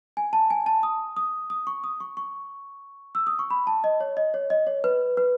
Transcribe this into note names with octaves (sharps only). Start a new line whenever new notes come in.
G#5
A5
G#5
A5
D#6
D#6
D#6
C#6
D#6
C#6
C#6
E6
D#6
C#6
B5
A5
D#5
C#5
D#5
C#5
D#5
C#5
B4
B4